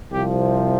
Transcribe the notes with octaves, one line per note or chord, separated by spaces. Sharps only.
C2 C3 F3 G4